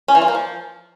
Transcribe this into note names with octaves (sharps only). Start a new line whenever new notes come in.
C#4
E3
F4
A#3
F3